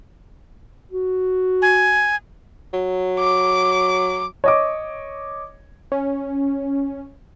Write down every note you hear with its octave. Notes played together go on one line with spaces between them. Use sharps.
F#4
G#5
F#3
D6
C#5 D#5 D6
C#4